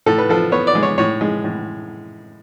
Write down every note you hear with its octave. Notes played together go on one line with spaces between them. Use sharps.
A2 A4
B4
F3 A4
B3 C#5
D5
G#3
C#5
A2 C#5
G#3
A2